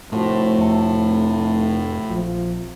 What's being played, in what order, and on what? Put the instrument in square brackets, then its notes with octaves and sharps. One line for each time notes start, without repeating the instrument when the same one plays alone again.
[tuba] F1 [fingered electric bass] A2 [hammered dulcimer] F3 F#4 C6
[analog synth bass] F2 [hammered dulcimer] C3 A4
[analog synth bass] A#1 [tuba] F3